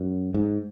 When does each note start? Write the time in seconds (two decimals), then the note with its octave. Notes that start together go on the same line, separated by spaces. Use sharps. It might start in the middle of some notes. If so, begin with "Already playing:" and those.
Already playing: F#2
0.34 G#2